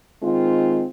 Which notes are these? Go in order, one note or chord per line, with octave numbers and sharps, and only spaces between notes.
D#3 G#3 C4 F4